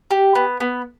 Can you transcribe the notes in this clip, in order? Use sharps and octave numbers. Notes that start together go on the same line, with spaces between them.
G4
B3
B3